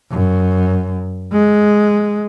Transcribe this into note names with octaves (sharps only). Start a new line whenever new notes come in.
F#2
G#3